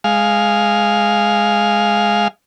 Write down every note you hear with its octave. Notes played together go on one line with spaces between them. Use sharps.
G#3 F5